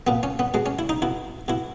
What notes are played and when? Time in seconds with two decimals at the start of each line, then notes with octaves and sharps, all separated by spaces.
0.07 A#2 B3
0.23 C#4
0.39 B3
0.54 B2 G#3
0.66 C#4
0.79 E4
0.89 D#4
1.02 B2 E4
1.48 B2 E4